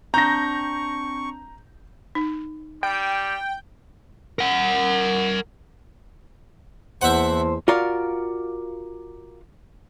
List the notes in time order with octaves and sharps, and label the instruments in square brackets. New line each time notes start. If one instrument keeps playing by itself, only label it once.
[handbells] C4 D4 [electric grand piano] A#5 [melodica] C#6 [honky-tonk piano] G6 A#6
[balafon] D#4
[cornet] G3 [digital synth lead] G5
[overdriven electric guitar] A#4 F#5
[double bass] E2 [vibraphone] A#3 E4 A5 [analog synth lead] C5 [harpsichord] E5 F#5
[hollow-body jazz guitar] F4 F#4 A#4 D5 F5